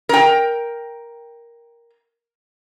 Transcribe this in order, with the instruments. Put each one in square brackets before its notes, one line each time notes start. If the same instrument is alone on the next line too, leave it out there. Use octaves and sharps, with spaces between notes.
[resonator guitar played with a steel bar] A#4 G5